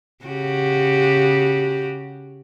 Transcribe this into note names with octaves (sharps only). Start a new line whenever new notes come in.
C#3 F#4 G4